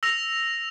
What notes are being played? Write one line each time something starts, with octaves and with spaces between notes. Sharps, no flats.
E6 A#6 F7